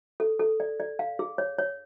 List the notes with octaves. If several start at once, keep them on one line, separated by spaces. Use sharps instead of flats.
A4
A4
D5
D5
F5
G#4
C#5
C#5